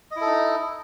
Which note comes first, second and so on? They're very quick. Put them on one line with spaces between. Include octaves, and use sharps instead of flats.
D#5 E4 A4 D#4